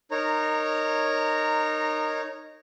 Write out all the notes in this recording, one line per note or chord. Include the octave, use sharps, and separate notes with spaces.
D#4 A#4 C#5 A#5